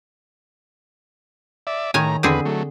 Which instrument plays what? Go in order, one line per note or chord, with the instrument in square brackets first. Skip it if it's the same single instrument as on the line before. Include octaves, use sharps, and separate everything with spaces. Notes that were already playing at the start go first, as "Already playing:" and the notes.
[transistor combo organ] D5 E5
[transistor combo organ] A2 A#5 [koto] D#3 C#5 G#5
[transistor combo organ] E2 B4 [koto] D3 C4 G#4
[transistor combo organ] F#3 A3